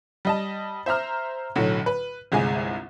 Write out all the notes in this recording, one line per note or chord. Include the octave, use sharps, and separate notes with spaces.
G3 D#5 A5
C5 E5 A#5 F6
B1 A2 D3 F#3
B4
G1 C2 G#3 G#5